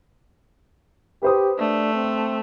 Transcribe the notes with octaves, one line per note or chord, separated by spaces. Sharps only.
G4 B4 C5 D#6
A3 D4
C4